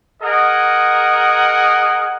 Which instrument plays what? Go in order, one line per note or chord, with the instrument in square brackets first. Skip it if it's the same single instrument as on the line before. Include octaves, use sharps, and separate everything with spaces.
[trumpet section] G#4 A#4 D#5 F#5